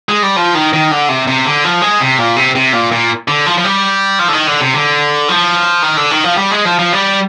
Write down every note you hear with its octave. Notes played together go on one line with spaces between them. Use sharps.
G#3
G3
F3
D#3
D#3
D3
C3
C3
D3
F3
G#3
C3
A#2
C3
C3
A#2
A#2
D3
F3
F3
G3
F3
D3
D#3
D3
C3
D3
F3
D#3
D3
D#3
F3
G3
G#3
F3
F3
G3